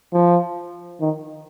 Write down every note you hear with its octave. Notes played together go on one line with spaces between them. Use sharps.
F3
D#3